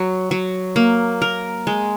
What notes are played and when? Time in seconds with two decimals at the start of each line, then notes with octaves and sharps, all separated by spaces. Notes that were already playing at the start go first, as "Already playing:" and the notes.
Already playing: F#3
0.31 F#3
0.76 A#3
1.22 A#4
1.67 G#3